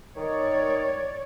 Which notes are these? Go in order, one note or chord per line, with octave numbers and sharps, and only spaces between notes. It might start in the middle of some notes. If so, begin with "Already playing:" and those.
D#3 C#5 D5